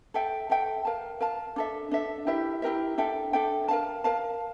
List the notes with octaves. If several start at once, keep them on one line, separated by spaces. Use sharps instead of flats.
A4 E5 G5
A4 E5 G5
A#4 F5 A5
A#4 F5 A5
D4 A4 E5
D4 A4 E5
E4 G4 A#4 E5
E4 G4 A#4 E5
D4 A4 E5 G5
D4 A4 E5 G5
A#4 F5 A5
A#4 F5 A5